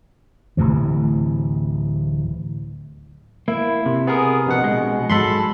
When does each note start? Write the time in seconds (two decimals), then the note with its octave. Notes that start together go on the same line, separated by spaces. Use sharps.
0.57 D1 A2 C3 E3
3.48 A#3 E4
3.86 C3
4.07 B3 G#4 A#4
4.46 A#1 B2 F#5
4.64 G#3
5.10 G#2 F#3 G#3 A4 B5 C6